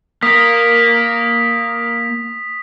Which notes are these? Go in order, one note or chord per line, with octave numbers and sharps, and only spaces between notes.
A#3 A#4 D#6 B6